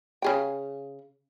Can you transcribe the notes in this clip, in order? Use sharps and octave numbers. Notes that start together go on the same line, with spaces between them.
C#3 G#4 G5